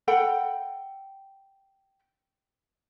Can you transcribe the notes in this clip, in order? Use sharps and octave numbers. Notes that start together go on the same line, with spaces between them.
A4 F#5 G5 B5